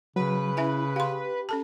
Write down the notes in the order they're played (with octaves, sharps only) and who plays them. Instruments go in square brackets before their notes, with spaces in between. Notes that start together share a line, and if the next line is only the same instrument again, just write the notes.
[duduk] C#3 [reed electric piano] F#3 [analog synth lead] B4
[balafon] C#4 E5 G#5 [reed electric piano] E4
[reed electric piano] G4 [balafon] F5 C6
[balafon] C#4 A4 A5